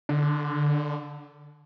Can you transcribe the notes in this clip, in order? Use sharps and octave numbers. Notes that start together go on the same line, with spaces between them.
D3